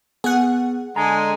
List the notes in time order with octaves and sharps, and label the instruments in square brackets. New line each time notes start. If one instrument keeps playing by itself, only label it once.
[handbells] B3 [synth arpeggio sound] G#4 F#5
[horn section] D3 G#3 G#5 [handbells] A#5